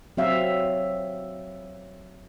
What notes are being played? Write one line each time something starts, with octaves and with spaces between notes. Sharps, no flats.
F#3 C4 E5 F5